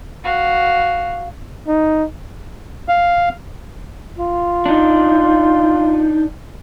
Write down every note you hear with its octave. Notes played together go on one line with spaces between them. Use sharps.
F#4 F5
D#4
F5
F4
D4 D#4